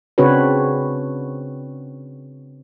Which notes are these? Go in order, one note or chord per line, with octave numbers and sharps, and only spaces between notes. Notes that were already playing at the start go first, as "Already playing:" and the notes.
C#3 C4 D4 F#4 B4 C#5